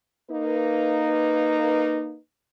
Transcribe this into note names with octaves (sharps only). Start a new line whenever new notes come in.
A#3 D#4 B4